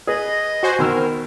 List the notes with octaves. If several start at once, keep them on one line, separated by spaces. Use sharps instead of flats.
G#4 B4 D#5
F#4 C5 G#5
B2 D#3 A#4 E6